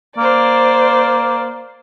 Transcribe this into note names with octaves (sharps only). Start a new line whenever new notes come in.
A#3 C5 D5